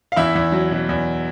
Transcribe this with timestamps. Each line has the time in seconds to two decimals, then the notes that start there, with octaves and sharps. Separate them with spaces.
0.12 F5
0.16 E2 E4 E5
0.35 E2
0.52 F#3
0.71 B2
0.89 E2